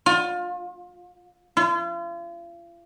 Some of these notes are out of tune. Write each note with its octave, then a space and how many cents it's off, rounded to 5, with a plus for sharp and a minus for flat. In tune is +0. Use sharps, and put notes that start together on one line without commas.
F4 +25
F4 -40